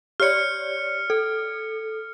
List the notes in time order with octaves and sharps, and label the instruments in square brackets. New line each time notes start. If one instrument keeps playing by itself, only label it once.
[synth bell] G4 C#5 D5 [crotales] F6 C#7
[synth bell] A4